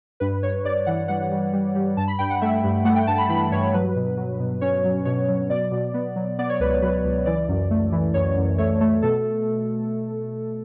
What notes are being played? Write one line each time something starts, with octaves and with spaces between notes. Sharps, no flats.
G2 B4
G2 C#5
G2 D5
E3 F#5
G3 F#5
G3
G3
G3
G2 A5
B5
G2 G5
F#5
A3 E5
G2
A3 F#5
G5
G2 A5
B5
E3 B5
G2 C#5
F#3 B4
B2
F#3
B2
C#4 C#5
F#3
B2 C#5
F#3
B2 D5
B2
B3
F#3
B3 D5
C#5
C#2 B4
B4
F#3 B4
C#2
E3 D5
F#2
A3
E3
F#2 C#5
F#2
A3 C#5
A3
B2 A4